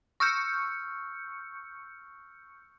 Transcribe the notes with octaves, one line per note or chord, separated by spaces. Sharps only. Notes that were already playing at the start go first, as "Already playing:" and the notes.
C#6 E6 F6 G6 C#7